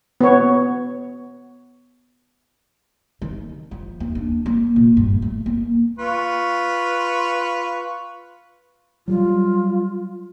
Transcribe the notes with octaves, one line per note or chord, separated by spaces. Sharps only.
B3 C#5
D#3
F3
D#2
D4
A#3
A#2
G2
A3
A#3
F4 B4 C#6
F#3 G3 F4